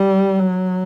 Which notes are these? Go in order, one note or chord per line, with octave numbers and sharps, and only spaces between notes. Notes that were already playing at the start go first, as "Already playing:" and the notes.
Already playing: G3
F#3